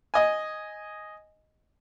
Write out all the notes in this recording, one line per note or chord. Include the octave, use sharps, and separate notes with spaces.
D#5 G#5